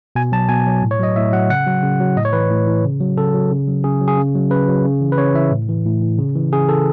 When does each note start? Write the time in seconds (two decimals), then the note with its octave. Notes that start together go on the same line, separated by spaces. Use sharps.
0.16 B2 G#5
0.32 F#3 A5
0.49 B2 G#5
0.66 F#3
0.82 A2
0.91 C#5
1.00 F#3 D#5
1.16 A2 E5
1.32 F#3 F#5
1.50 C#3 F#5
1.66 F#3
1.83 C#3
2.00 F#3
2.16 A2 D#5
2.25 C#5
2.33 E3 B4
2.50 A2
2.67 E3
2.84 C#3
3.01 F#3
3.17 C#3 A4
3.34 F#3
3.51 C#3
3.67 F#3
3.84 C#3 G#4
4.01 F#3
4.08 G#4
4.17 C#3
4.35 F#3
4.51 C#3 B4
4.68 F#3
4.84 C#3
5.01 E3
5.12 B4
5.18 C#3 C#5
5.34 E3 E5
5.51 A2
5.69 E3
5.85 A2
6.02 E3
6.18 C#3
6.35 E3
6.52 C#3 G#4
6.69 E3 A4